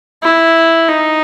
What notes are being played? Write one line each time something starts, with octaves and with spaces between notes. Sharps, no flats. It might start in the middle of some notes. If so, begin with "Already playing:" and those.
E4
D#4